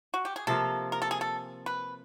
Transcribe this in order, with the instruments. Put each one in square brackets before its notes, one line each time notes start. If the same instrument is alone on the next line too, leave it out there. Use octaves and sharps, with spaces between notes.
[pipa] F#4
G4
G#4
[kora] C3 F3 A#3 [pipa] A4
[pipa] A#4
A4
G#4
A4
B4